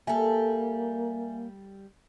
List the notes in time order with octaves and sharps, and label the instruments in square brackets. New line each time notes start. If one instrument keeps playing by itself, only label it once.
[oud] G3 A4 [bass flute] A#3 [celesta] E5 G#5